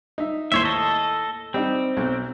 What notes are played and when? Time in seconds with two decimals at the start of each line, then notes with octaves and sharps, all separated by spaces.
0.18 D#4 E5
0.52 D#2 A2 C5 C#5 E5
0.65 A4 D#5
1.54 G3 C4 D#4 G4
1.97 B1